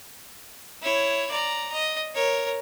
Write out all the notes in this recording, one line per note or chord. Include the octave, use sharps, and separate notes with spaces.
E4 C#5
D5 A#5
D#5
A#4 C#5